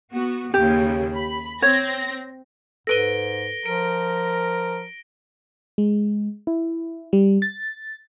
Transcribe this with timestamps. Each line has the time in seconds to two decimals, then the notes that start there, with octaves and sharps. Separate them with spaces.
0.12 B3 F#4
0.54 D#2 C#3 G4
1.14 B5
1.62 C4 C#5 A#6
2.87 G#2 A4 B4 A#6 D7 D#7 G7
3.66 F3 A#4 D7
5.78 G#3
6.47 E4
7.13 G3
7.42 A6